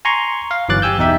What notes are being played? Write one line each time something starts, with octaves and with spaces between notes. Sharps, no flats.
G#5 A#5 C6 C#6
F5
G1 E3 F#3 D6 F#6 A6
G4 G#5 E6 G6
E2 B2 D#4 G4 E5